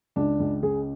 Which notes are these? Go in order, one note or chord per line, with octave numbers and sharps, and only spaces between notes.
C#2 D4
C#2
C#3 G#4